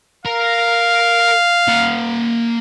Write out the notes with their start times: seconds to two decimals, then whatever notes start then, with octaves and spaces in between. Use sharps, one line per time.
0.26 A#4 F5 A#5
1.68 A#3 F#5